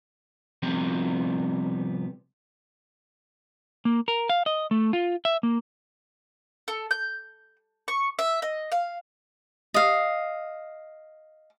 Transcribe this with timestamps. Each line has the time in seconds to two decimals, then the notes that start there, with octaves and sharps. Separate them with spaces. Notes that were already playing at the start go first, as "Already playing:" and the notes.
0.62 C3 F3 G3 B3 C4
3.85 A#3
4.08 A#4
4.30 F5
4.46 D#5
4.71 A3
4.93 F4
5.25 E5
5.43 A#3
6.68 A4
6.91 G6
7.88 C#6
8.19 E5
8.42 D#5
8.72 F5
9.74 D#5 F5